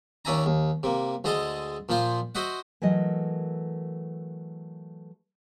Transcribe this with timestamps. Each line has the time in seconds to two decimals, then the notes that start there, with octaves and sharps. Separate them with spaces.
0.25 D#2 C#4 D4 E5 G#5 A#5
0.46 D#2
0.83 C3 A#3
1.24 D2 G#3 G#4 A4 D#5 A5
1.89 A#2 F3 F4 C5
2.35 F#4 C5 D#5 E5 F#5
2.82 E3 F#3 A3 A#4 D#5